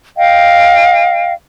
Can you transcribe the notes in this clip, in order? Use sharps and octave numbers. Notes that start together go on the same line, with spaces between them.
D#5 F5 G5